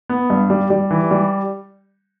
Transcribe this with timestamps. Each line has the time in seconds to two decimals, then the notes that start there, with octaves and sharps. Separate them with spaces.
0.09 B3
0.30 G2
0.50 G3
0.70 G3
0.91 E3
1.11 G3